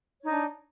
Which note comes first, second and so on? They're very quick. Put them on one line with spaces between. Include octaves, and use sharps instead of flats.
C#5 D#4 D4